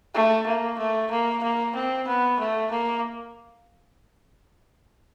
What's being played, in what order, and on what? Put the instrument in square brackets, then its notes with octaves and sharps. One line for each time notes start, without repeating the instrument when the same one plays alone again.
[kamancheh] A3
A#3
A3
A#3
A#3
C4
B3
A3
A#3